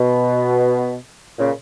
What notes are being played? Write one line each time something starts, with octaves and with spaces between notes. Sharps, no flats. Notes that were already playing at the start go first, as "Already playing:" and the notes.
Already playing: B2
A#2 C#3